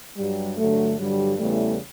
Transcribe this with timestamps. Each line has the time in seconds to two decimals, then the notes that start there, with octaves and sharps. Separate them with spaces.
0.17 G2 F#3 G3
0.57 G2 D3 F#3 A3
0.97 G2 D3 F#3 G3
1.37 E2 C#3 E3 G3 A3